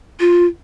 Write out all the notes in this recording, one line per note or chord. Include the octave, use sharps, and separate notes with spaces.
F4